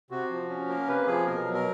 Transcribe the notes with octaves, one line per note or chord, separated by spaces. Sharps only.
C3 F#4
F3
C#4
A#3 A#4
C3 B4
F3 G#4
B2 A#4
F#3
A#4